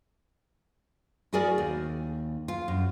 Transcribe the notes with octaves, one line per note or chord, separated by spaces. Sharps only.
E4 F#4 G#4 A#4 D5
D#2
F4
F#2